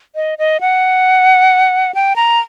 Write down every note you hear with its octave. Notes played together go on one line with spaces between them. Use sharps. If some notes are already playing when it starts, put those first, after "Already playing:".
D#5
D#5
F#5
G5
A#5